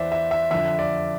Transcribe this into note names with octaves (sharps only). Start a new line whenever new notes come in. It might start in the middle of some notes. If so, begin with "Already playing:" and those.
Already playing: E2 E3 C5 D5 E5
E5
E5
F2 D3 F3 E5
D5